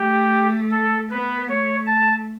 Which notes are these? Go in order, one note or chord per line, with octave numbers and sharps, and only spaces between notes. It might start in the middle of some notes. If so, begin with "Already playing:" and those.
Already playing: A3 G4
A4
B3 B4
A3 C#5
A5